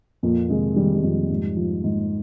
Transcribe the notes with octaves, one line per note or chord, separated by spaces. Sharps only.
F2 A#2 A#3
C3 G#3
D#3 G3
G3
F2
G#2
F3
G#2